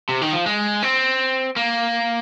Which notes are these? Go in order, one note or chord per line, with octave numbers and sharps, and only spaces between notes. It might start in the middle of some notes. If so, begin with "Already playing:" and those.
C3
D#3
F3
G#3
C4
A#3